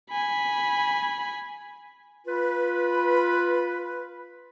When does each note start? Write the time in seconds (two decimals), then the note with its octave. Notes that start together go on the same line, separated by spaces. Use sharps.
0.11 G#5 B5
2.27 F4 B4